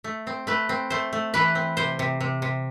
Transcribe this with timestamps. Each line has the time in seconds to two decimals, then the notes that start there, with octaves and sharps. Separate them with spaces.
0.04 A3
0.27 C4
0.47 A3 B4
0.69 C4
0.90 A3 C5
1.13 A3
1.34 E3 B4
1.55 C4
1.77 C3 C5
1.99 C3
2.21 C3
2.42 C3